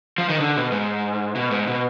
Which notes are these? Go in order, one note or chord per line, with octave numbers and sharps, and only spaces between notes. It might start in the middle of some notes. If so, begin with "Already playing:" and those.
F3
D#3
D3
B2
G#2
B2
G#2
B2